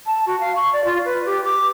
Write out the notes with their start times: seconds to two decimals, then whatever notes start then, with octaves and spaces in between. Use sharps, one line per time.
0.06 A5
0.27 F#4
0.40 F5
0.56 C#6
0.73 D5
0.85 F4
1.05 B4
1.26 G4
1.44 D6